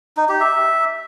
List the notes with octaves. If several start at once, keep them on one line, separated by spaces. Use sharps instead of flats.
D#4
G4
E5